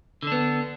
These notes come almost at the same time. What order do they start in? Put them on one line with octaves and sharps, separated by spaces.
D3 D4 B3